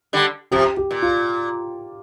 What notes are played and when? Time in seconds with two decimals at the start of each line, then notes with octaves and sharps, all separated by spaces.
0.13 D3 G3
0.51 C3 F3 G4
0.77 G4
0.91 A#2
1.02 F4